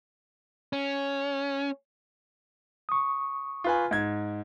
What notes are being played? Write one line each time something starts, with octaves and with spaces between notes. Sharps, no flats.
C#4
C#6 D#6
F4 B4 G#5
G#2 G#6